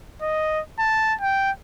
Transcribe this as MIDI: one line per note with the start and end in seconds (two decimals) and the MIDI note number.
0.22 0.61 75
0.79 1.14 81
1.21 1.51 79